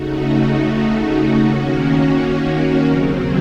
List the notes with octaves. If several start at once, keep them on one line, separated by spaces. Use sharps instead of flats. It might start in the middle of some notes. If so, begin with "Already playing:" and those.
Already playing: C#3 A3 D#4 F#4
D#3 A#3 C#4 F#4
D#2 C#3 F#3 C4